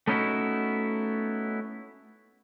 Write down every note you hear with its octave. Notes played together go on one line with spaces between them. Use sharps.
A3 B3 C#4 D#4 E4 F#4